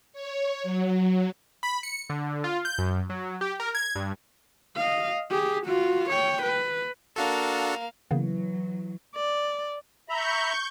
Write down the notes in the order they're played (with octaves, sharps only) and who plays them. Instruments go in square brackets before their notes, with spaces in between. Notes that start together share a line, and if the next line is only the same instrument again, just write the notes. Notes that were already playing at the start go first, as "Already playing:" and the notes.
[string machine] C#5
F#3
[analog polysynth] B5
C#7
D3
F4
G6
F#2
F#3
G4
A#4
G#6
G2
[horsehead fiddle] D#5 F5
G4 G#4
F4 F#4
C#5 G5
B4
[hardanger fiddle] A#3 F5 [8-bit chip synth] D4 F#4 A4
[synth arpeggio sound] C#3 A#3 B3 [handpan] E3 [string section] F#3
[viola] D5
[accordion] E5 A#5 B5 [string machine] C#6 G6